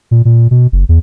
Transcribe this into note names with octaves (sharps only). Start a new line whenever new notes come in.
A#2
A#2
B2
F#1
E2